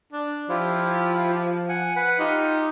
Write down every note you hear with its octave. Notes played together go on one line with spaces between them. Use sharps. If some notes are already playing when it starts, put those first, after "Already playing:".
D4
F3 E4 F4 G4
F#5 G#5
B4 F#5
D#4 F4 G4